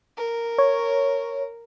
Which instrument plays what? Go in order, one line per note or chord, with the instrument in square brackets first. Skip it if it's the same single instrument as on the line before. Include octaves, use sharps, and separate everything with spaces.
[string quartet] A#4
[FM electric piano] C#5